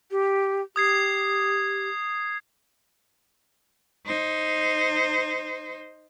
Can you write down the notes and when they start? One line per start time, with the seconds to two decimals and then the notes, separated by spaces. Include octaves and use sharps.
0.11 G4
0.76 G4 D#6 G#6 C7
4.06 D#4 C5